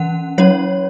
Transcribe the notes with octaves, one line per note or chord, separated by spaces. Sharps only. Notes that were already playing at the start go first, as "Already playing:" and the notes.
Already playing: E3 C#4 F#5
F#3 C#4 C#5